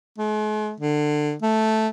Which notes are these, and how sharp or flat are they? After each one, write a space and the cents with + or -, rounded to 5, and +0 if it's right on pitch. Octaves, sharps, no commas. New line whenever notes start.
G#3 +45
D3 +25
A3 -5